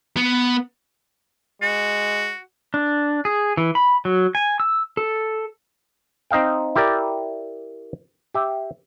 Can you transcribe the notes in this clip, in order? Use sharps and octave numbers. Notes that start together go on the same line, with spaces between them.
B3
G#3 F#4
D4
G#4
E3
B5
F#3
G#5
E6
A4
C4 D#4 D#5 F5 G5
E4 G4 A#4 D5
G4 E5